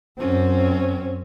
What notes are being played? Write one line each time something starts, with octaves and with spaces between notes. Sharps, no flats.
F#2 C4 C#4